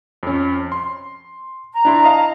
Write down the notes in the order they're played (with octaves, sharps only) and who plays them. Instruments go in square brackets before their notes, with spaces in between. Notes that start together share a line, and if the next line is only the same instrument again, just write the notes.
[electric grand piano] F2 C#4
C6
[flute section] A#5
[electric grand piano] D4 E4 C6
D#5 F5 A5